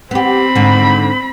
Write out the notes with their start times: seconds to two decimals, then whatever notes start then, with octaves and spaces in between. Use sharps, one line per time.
0.11 B3 C4 G4 B5
0.55 G#2 D3